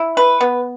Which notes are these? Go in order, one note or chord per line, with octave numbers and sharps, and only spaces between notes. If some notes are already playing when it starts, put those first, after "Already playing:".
Already playing: E4
B4
B3